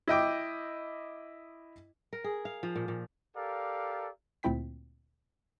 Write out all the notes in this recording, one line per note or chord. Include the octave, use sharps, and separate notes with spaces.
E4 D#5 G5 D6
A#4
G#4
F5
F3
A#2
A#2
G4 A4 A#4 D5 F5
D2 A#2 C4 E4 G5 B6